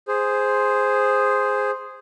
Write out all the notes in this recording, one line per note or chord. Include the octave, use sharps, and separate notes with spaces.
G#4 C5